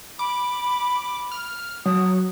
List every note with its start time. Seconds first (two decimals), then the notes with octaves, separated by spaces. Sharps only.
0.19 B5 D6
1.32 F6
1.86 F#3 D#6